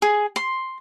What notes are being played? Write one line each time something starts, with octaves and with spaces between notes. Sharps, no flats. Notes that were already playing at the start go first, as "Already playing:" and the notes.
G#4
C6